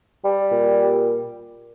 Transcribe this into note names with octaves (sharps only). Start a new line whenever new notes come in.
G3
A#2